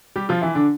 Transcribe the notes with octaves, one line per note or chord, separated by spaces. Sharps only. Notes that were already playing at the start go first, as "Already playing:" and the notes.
G3 G4
F3 F4
E3 E4
D3 D4